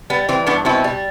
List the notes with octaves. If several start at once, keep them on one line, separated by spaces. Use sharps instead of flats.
G3 B3
E3 C4
G2 B3 D4
B2 C4 E4
G3